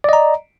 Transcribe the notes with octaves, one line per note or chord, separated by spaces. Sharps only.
D5 D#5 A#5